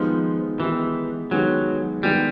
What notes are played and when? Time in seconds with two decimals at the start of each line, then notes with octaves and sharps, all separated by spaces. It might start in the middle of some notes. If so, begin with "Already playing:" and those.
Already playing: D#3 F3 G#3 B3 D#4 G4
0.60 D#3 E3 G#3 B3 D#4 G4
1.31 D#3 F#3 G#3 B3 D#4 G4
2.03 D#3 G3 G#3 B3 D#4 G4